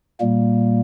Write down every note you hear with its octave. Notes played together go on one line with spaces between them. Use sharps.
A#2 G3 A#3